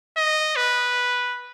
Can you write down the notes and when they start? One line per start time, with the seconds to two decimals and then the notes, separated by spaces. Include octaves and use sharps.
0.17 D#5
0.56 B4